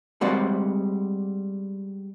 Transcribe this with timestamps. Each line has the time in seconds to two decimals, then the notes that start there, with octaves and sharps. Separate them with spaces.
0.21 G3 G#3 C4 F#4 D5